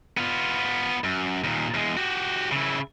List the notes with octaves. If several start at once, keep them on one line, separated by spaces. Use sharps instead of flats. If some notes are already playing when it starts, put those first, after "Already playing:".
B3 F4
F#2
D#2 A#2
E2 G#3
F#4 G4
C#3 E4